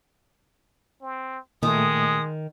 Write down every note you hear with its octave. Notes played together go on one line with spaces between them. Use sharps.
C4
A#2 D#3 G#3 A3 D#6